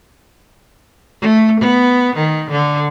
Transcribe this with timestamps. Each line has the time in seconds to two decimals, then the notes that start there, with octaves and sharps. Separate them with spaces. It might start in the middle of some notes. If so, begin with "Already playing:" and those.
1.21 A3
1.60 B3
2.15 D#3
2.51 D3